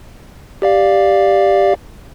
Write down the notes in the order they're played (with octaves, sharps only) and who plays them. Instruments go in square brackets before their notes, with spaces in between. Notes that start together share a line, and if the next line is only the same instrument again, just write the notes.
[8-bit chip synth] G4 D5 F5